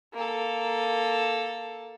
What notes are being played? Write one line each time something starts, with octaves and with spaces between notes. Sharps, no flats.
A#3 A4